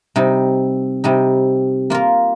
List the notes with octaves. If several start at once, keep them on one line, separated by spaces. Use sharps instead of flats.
C3 G3 D#4
C3 G3 D#4
A#3 F4 A#4